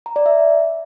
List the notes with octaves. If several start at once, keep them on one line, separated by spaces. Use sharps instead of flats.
A#5
D5
E5